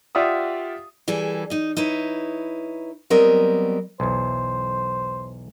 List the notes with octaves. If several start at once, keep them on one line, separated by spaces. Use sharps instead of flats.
F4 G4 D5 E5 F#5 D#6
E3 G3 G#4 A4
D#4 D#5
D#4 E4 B4 C#5
F#3 G3 B3 C4 A#4 D#5
B1 E2 C5